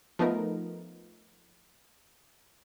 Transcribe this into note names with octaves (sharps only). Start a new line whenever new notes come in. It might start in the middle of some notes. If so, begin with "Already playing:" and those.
F3 A3 B3 D#4 A#4